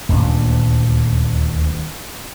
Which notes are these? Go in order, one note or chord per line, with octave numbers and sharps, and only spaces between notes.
D#1 D2 A#2 D4